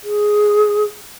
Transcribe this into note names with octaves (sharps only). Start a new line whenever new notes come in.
G#4